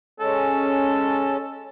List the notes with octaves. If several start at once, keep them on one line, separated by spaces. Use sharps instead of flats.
G#3 C#4 A4